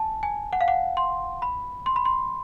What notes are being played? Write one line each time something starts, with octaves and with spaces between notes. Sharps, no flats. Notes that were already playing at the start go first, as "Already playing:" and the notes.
Already playing: G#5 A5
G#5
F#5
F5
F#5
C6
B5
C6
B5
C6